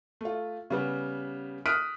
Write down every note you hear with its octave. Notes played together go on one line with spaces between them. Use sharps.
A3 F4
C#3 G3 B3
D#6 F6 F#6 B6 D7 D#7